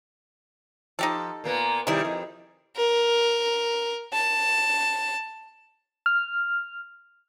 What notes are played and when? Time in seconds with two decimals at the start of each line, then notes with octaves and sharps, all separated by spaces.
0.99 F3 D#4 G4 A4
1.44 A#2 A#3 B3
1.87 C3 D#3 G3 E4 G#4
2.05 F2
2.77 A#4
4.13 A5
6.06 F6